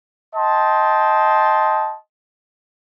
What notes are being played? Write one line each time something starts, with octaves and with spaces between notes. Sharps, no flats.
D#5 G5 A5 C6